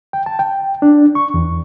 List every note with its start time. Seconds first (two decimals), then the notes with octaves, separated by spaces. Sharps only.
0.13 G5
0.26 A5
0.39 G5
0.82 D4
1.15 C#6
1.34 E2